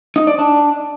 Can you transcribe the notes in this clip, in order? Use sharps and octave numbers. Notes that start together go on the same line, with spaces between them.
D#4
D5
D4